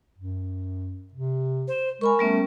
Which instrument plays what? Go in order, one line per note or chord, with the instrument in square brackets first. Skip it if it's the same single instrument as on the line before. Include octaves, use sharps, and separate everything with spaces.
[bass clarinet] F#2
C3
[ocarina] C5
[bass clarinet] G#3 [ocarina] A#4 [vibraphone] G#5 B5 C#6
[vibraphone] G3 B3 C#4 [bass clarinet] A3